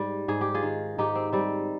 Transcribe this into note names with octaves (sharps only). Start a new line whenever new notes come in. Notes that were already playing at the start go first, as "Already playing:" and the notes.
Already playing: G#2 G3
G#2 G#4
G4
F4 G#4
D#3
G#2 D#4 G4
C4
G3 C4